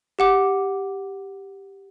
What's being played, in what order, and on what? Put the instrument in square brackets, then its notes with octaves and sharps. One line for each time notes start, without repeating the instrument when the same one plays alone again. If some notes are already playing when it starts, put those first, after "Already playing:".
[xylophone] G4 F#5 D6